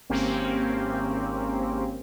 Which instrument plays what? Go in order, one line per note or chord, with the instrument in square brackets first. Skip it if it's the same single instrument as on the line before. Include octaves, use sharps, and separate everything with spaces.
[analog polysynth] G#1 A#3 C4 C#4 G4